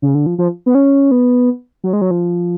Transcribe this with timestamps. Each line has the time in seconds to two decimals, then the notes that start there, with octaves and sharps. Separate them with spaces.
0.02 C#3
0.15 D3
0.26 F3
0.38 F3
0.66 B3
0.75 C#4
1.11 B3
1.84 F#3
1.93 G#3
2.01 F#3
2.11 F3